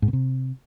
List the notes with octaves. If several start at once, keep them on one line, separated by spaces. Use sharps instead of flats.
G#2
B2
C3